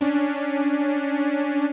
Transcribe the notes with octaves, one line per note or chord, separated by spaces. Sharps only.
C#4 D4